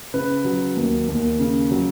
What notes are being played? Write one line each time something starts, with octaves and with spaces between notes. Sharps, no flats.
C#3 B4
F#3
D#2
D#2
C#3
F#3